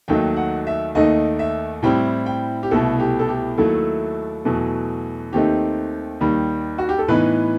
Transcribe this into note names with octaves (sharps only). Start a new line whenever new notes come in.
D#2 D#3 F#3 A3 D#4 G5
F#5
E5
D#2 D#3 A3 D#4 D#5
E5
A2 G3 C4 E4 G5
G5
G4
C2 B2 A3 E4 A4
G4
A4
G4
D#2 D#3 F#3 A3 E4 A4
E2 B2 F#3 A3
D#2 D#3 A3 C4 D#4 G4
D#2 D#3 G3
F#4
G4
A4
A2 E3 B3 D#4 B4